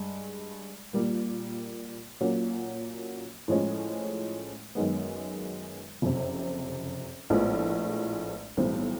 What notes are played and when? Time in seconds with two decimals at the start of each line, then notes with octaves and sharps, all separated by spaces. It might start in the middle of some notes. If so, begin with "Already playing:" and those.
Already playing: G2 G#3
0.93 A#2 G3 A#3
2.21 A#2 F#3 A#3 C#4
3.48 A2 F3 G#3 C#4
4.75 F#2 D#3 G#3 B3
6.02 F#1 F2 C3
7.30 A#1 A2 F3 G#3 B3
8.57 B1 A2 E3 G3 C4